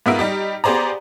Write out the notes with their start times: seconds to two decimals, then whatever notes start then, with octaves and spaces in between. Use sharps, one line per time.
0.06 G#2 B3 F4 A#4 E5 D7
0.19 G3 D#4 G4
0.64 B3 G4 G#4 C5 D5 A#5